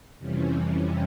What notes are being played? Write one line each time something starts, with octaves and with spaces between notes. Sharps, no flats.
F2 C3 E3 G3 C#4